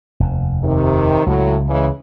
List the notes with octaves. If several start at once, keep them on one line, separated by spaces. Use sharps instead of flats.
F1 D#2
C3 D#3
C#2 A2 F#3
C#3 E3 G#3